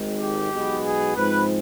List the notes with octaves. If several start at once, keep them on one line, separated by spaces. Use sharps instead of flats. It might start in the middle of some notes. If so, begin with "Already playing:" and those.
Already playing: G#1 G#2 D#3 G#3
G4
B1 B2 G#3 B3
G#4
G#2 F3 G#3 C4 B4